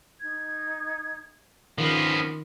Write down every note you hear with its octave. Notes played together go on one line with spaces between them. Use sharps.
D#4 G#6
D#3 F3 B3 C#4 F4